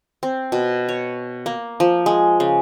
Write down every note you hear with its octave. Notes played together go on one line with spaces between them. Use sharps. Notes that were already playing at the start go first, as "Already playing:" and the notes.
C4
B2
C#5
A#3
F3
G#3
C#3